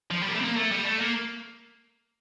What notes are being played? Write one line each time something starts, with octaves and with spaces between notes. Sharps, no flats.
F3
G3
A#3
A3
C4
A#3
A3
G3
A3
A#3